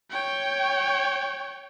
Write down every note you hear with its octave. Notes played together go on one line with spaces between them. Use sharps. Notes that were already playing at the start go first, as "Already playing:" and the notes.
C#5 G5